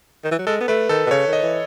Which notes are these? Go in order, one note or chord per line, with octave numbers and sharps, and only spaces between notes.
D#3
E3
F#3
G#3 A4
B3
A3 B4
D#3 A4
B2
C#3 C#5
D#3
D#5
E3